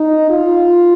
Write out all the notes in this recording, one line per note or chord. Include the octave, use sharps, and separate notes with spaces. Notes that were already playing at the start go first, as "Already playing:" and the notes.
Already playing: D#4
F4